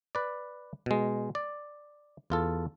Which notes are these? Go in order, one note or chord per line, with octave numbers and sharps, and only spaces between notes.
B4 D5
B2 G#3
D5
E2 F4 A4